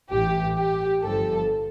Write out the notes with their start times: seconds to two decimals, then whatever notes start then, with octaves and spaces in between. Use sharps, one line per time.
0.10 A1 G2 E3 G4
0.56 G4
1.03 G1 G2 F3 A4